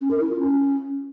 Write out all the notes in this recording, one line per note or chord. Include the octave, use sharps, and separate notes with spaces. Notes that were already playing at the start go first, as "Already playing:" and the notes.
C#4
A#4
E4
F4
C#4